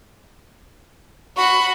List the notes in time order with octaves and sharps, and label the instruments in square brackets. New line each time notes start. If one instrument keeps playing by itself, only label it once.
[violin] F#4 B5 [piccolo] C#6